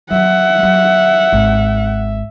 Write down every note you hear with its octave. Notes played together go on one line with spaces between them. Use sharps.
F#3 E5 F#5
F#3
G#1